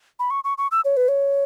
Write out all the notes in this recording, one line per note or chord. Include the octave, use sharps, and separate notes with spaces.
B5
C#6
C#6
C#6
E6
C#5
B4
C#5